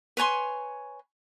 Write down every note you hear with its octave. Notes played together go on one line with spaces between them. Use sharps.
B4 C#5 G#5 C6